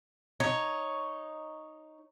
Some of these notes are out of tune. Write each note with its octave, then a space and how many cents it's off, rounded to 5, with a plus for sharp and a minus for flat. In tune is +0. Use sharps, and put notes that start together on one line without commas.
D#4 +0 C#5 +0